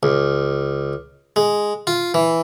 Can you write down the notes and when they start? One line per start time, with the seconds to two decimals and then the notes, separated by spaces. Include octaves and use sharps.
0.03 C#2
1.36 G#3
1.87 F4
2.14 E3